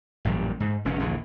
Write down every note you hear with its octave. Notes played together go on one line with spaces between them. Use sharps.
A1 F#2 A#2 G3
G#2
F1 F#2 C#4
A#1 D#2 D3 E3